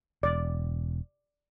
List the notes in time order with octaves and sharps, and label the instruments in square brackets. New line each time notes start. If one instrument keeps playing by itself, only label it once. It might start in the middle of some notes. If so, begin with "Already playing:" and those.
[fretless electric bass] E1 [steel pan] D5